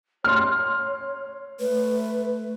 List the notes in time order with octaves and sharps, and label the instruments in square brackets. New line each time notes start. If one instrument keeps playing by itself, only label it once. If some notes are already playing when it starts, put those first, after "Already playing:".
[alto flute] C#5 [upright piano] C6 F6
[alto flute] A3 [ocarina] B4